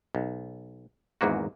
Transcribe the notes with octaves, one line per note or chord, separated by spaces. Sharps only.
B1
G#1 E2 G#2 A#3 F#4